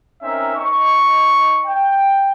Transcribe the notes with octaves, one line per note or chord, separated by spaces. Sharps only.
C4 C#4 D#4 A#4 E5
D#4 D#5 C#6
G5